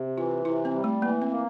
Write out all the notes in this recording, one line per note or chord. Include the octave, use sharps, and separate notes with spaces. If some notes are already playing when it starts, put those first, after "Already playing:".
Already playing: C3
E3 F4
C3 E4
C4
G3
A3
E3 A#3
C4
A#3